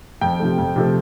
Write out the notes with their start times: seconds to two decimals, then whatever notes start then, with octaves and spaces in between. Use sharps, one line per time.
0.21 F2 G5
0.39 C3 F3 A3
0.58 F2
0.76 C3 F3 A3